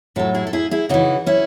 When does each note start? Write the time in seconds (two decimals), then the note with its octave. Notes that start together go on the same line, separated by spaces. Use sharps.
0.16 A2 F#3 F#4 A4
0.34 E4 G#4
0.47 A4
0.53 E4 G#4
0.71 E4 G#4
0.89 C#3 E3 D#4 F#4
1.26 C#4 E4